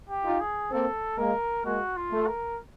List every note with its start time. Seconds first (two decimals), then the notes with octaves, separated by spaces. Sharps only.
0.09 G4
0.24 D#4 F4
0.40 G#4
0.72 A#3 C4 A4
1.17 G#3 A#3 A#4
1.64 G#3 A#3 F#4
1.96 F4
2.12 A3
2.27 A#4